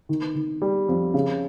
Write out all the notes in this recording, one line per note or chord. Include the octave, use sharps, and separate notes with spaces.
D#3
D#3
G3
F2
C#3